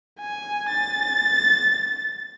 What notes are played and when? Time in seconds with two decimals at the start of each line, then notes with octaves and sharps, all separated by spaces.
0.20 G#5
0.69 A6